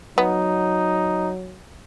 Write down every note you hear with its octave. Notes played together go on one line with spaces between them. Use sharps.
F#3 B3 D#4